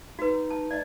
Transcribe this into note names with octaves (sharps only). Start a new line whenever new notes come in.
D#4 F#4 B4
A5
D5 D#5